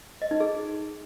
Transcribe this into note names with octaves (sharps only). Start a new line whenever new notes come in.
D#5
D#4
G#4